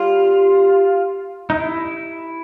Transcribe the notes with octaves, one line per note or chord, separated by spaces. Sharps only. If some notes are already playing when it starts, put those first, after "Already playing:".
Already playing: G3 F4
D#4
E4